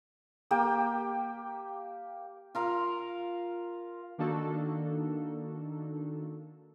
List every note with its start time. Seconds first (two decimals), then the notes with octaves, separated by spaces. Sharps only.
0.51 A#3 G4 G5
2.55 F4 A#4 F5
4.18 D#3 A#3 D4 D#4 F#4 A4